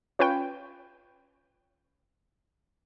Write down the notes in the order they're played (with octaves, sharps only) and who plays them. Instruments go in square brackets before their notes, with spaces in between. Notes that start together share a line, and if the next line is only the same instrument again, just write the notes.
[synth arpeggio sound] C#4 F4 B4 C#5 G5